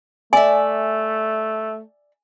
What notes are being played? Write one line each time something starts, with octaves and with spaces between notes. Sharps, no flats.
A3 D5 E5 G#5